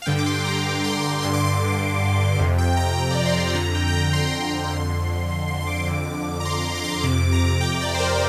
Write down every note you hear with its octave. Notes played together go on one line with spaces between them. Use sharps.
F5
G2 D3 G5
D6
C6
A#5
C6
C6
G2 D3 C6
D6
C6
F2 C3
G5
A#5
G5
D5
C6
C6
F2 D3 A#5
G5
G5
A#5
C6
A#5
C6
F2 D3 C6
C6
C6
C6
D6
F2 D3
A#5
C6
A#5
D6
C6
F2 C3 D6
A#5
G5
D5
C5
A#4